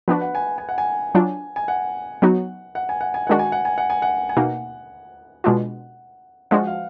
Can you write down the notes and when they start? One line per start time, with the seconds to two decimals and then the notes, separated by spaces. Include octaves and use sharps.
0.08 F3 B3 D4 F#4 B4
0.21 F#5
0.35 G#5
0.58 G#5
0.69 F#5
0.78 G#5
1.15 F#3 D4 F4
1.56 G#5
1.68 F#5
2.22 F#3 B3 D#4 F#4
2.75 F#5
2.89 G#5
3.01 F#5
3.14 G#5
3.27 D#3 G#3 D4 F#4 F#5
3.39 G#5
3.52 F#5
3.65 G#5
3.78 F#5
3.90 G#5
4.02 F#5
4.29 G#5
4.37 B2 A#3 D#4 F#5
5.44 B2 G#3 D4 F4
6.51 F3 G#3 D4 F#4 F#5
6.67 F5